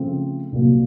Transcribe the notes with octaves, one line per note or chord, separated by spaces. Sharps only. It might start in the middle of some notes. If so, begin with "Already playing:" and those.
Already playing: C#3 F3 A3 C4 F4
C2 A#2 F#3 A#3